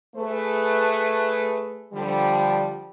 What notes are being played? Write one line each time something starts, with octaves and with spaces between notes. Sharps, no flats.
A3 G#4 B4
D3 F3 G3